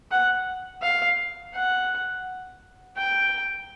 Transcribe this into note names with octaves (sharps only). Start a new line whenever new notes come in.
F#5
F5
F#5
G5